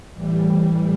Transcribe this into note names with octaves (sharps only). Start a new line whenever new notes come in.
A2 E3 G3